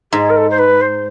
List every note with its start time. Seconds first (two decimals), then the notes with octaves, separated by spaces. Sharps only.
0.12 G#2 G#4
0.29 A#4
0.36 A4
0.49 C5
0.58 B4
0.81 C5